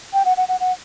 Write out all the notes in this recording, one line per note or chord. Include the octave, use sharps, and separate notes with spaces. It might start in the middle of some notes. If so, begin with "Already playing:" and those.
G5
F#5
F#5
F#5
F#5